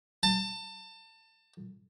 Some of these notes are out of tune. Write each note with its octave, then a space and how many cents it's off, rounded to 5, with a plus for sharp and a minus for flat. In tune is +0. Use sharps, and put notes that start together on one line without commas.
A5 +30